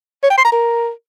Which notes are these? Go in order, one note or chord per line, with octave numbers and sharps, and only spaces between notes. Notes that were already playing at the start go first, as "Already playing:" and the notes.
C#5
G5
C6
A#5
A#4